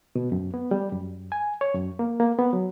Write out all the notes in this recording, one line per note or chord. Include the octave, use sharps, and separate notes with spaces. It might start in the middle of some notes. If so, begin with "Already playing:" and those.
B2
F#2
B3
G3
F#2
G#5
C#5
F#2
A#3
A#3
B3
F#3